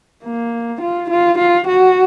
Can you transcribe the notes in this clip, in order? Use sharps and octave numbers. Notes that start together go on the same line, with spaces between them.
A#3
F4
F4
F4
F#4